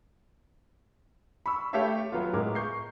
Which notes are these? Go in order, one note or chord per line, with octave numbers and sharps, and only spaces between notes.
B5 C#6 E6
A3 G4 A4 C#5 E5 F5
F#3 B3 F4
A2 G#3 A#4 D6
C#6 G6 C7